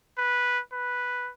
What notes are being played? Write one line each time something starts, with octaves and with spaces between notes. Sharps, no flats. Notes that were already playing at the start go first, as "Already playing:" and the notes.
B4
B4